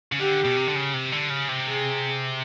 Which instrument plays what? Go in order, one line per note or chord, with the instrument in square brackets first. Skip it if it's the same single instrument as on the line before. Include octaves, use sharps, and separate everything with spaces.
[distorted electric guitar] C#3
[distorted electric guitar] D3 [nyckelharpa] G4
[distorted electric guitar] B2
C3
D3
C#3
C3
D3
C#3
C3
[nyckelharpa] G#4